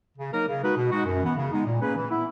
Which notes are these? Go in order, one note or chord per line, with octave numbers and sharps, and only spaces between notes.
C#3
F#3 A#3 D#4 A#4
C#3
G#3 D#4 F#4 B4
B2
G#3 D#4 F#4
F#2
E3 B3
C#3
G#3 B3 D#4
A#2
A#3 C#4 G#4 B4
E3
B3 E4